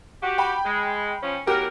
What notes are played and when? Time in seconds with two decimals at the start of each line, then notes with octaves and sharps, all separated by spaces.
0.23 F#4 G4
0.38 G5 B5
0.65 G#3
1.23 F3 C#4
1.47 E2 F#3 G4 A#4